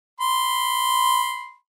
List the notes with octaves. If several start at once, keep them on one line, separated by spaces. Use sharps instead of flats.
B5 C6